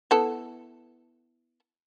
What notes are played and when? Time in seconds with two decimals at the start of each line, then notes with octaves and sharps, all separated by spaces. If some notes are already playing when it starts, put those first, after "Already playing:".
0.11 B3 E4 A4